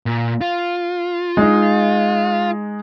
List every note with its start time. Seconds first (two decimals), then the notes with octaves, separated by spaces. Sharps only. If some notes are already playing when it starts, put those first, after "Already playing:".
0.06 A#2
0.41 F4
1.37 G#3 D#4